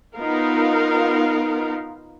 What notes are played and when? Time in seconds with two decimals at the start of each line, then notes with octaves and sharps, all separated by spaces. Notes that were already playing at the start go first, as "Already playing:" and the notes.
0.15 B3 D#4 F4 A#4 F5